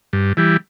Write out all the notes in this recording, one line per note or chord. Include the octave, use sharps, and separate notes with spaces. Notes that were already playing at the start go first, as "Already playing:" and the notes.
G2
E3 G3